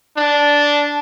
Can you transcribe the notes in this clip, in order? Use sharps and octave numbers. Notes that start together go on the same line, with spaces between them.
D4